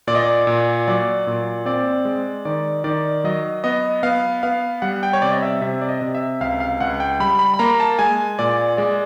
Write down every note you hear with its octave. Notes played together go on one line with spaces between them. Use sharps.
A#2 D5
D#5
D5
A#2
F#3 D5
A#2
C4 D5
G#3
D#3 D5
D#3 D5
F#3 D#5
B3 D#5
B3 F5
B3 F5
G3 F#5
G5
C#5
C3 D5
D#5
E5
C3 E5
D5
D#5
C3
E5
C#2 F5
F5
C#2 F#5
G5
G3 B5
B5
B5
A#3 A#5
A5
G#3 G#5
A#2 D5
G#3 D5